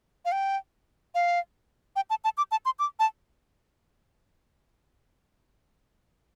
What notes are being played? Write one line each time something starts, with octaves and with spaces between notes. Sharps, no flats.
F5
G5
F5
G5
A5
A5
D6
A5
C6
D6
A5